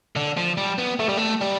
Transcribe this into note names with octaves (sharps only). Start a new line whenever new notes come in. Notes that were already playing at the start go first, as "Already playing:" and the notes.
D3
F3
G3
B3
A3
G3
A3
G3